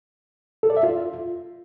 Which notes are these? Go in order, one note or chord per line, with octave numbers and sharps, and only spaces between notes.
A4
D5
E5
F4